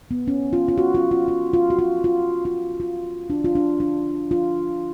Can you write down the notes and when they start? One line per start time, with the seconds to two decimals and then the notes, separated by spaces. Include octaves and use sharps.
0.11 B3
0.28 C#4
0.53 F4
0.68 F4
0.78 F#4
0.95 F4
1.11 F4
1.28 F4
1.53 F4
1.70 F#4
1.79 F4
2.04 F4
2.45 F4
2.80 F4
3.30 D4
3.45 F4
3.55 D4
3.80 D4
4.31 F4